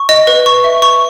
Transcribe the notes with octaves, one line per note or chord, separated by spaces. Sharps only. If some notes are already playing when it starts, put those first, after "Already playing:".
Already playing: C#6
D#5
B4
C#6
E5
C#6